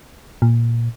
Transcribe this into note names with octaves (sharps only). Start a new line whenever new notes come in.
A#2